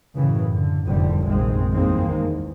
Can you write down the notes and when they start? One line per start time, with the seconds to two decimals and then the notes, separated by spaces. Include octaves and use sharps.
0.15 F#2 A2 C#3 E3
0.53 D3
0.85 F1 D#2 A2 D3 G3 C4
1.25 A#1 F#2 D#3 G#3 C4
1.72 E2 G2 D#3 G#3 A#3 C4
2.22 E2